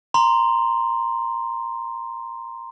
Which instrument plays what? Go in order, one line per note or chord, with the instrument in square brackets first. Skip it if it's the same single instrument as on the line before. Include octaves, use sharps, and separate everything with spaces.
[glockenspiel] A#5 C6